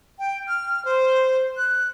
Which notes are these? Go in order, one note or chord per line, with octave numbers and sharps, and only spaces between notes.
G5
F6
C5
F#6